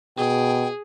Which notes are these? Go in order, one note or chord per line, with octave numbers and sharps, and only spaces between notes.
B2 G#4 G5